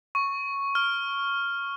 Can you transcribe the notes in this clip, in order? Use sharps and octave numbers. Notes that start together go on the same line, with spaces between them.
C#6
F6